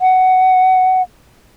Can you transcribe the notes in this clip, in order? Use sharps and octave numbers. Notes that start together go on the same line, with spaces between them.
F#5